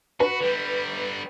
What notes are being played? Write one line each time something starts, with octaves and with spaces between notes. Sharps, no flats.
F#4 B4
D3 G3